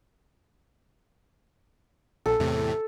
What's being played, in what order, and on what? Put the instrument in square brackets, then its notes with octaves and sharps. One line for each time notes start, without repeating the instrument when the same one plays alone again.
[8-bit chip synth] A#1 [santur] A4
[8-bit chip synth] E2 A2 C3